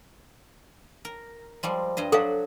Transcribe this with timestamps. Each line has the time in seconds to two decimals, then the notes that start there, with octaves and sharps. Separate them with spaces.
1.05 A#4
1.63 F3 G3 G#3
1.97 G2 C5 D#5
2.12 F#3 D4 F#4 A4 F5